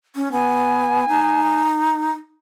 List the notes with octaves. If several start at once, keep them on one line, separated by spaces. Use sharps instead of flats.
C#4
B3 G#5
D#4